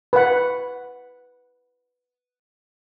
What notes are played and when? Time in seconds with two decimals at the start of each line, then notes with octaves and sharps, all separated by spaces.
0.13 B4 F#5